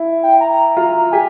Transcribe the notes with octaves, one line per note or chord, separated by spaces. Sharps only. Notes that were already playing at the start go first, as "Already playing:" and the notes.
Already playing: E4
G5
A#5
F4 A#5
G4 G#5